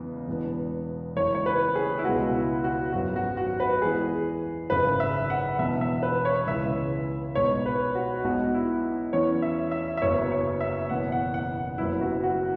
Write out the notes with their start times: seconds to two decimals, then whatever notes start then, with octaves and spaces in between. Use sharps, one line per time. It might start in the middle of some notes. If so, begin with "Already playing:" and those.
Already playing: E2 C#3 G#3 B3
0.27 E1 E2 B2 B3
1.16 F#1 F#2 E3 G#3 C#5
1.35 C#5
1.46 B4
1.76 G#4
1.99 E4
2.04 C#2 B2 G#3 B3 F#4
2.34 E4
2.64 F#4
2.93 G#1 F#2 F#3 B3 F#4
3.16 F#4
3.37 F#4
3.60 B4
3.82 E2 E3 G#3 G#4
4.70 G#1 F#2 C#3 B4
5.00 E5
5.30 F#5
5.59 E1 E2 B2 E5
5.81 E5
6.03 B4
6.25 C#5
6.47 C#2 C#3 E3 G#3 E5
7.35 B1 B2 G#3 B3 C#5
7.66 B4
7.95 F#4
8.24 B1 B2 G#3 B3 F#4
8.54 E4
9.13 E2 E3 C#4 C#5
9.42 E5
9.71 E5
9.97 E5
10.02 F#1 F#2 F#3 B3 C#5
10.31 C#5
10.61 E5
10.89 F#1 E2 B2 B3 F#5
11.12 F#5
11.34 F#5
11.78 F#1 F#2 F#3 B3 E4
12.01 F#4
12.23 F#4